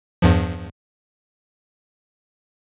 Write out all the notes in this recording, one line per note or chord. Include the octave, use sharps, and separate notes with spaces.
E2 G2 F3